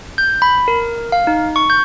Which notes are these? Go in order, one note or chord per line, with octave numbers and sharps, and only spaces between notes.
G6
B5
A#4
F5
D#4
C#6
G6